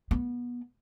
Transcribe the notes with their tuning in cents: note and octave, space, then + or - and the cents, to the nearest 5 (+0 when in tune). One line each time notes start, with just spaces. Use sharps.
B3 -25